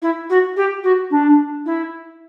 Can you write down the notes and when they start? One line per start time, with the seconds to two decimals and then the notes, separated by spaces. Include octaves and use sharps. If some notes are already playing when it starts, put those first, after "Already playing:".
0.02 E4
0.30 F#4
0.57 G4
0.84 F#4
1.11 D4
1.66 E4